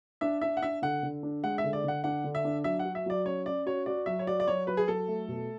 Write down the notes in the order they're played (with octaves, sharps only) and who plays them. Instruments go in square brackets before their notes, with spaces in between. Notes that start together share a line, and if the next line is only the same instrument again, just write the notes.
[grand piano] D4 [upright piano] E5
[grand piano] D4 [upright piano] E5
[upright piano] F#5
[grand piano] D4 [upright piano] E5
[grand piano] D3 [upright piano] F#5
[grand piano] D3
D4
[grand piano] G#3 [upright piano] F#5
[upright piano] E5
[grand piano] D3
[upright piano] D5
[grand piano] D3 [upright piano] F#5
[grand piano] D4 [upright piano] F#5
[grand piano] D3
[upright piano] E5
[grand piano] D4
[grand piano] F#3 [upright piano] E5
[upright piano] F#5
[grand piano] F#4
[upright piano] E5
[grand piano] F#3 [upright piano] D5
[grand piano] C#4 [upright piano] C#5
[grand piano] C#4 [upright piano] D5
[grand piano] F#4 [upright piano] C#5
[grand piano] F#4 [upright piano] D5
[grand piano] F#3 [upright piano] E5
[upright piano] C#5
[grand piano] F#4 [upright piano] D5
[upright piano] D5
[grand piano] F#3 [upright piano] C#5
[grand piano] F#3 [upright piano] B4
[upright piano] G#4
[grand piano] F#3 [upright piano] A4
[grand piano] A3
B2